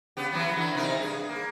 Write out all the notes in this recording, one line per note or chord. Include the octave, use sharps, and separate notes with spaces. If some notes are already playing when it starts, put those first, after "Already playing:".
C#3 B3 G4
E3 F#3 B3
D3 E3
C3 D#4 A#4
G2 G#4
A#3